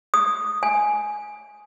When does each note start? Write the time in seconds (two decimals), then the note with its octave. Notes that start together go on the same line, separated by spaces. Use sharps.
0.14 D#6
0.63 G#5